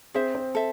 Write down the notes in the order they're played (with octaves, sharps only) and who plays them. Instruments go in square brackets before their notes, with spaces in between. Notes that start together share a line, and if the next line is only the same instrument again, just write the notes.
[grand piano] C4 [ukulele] G#4 C5 E5
[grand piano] C4
[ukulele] A4 E5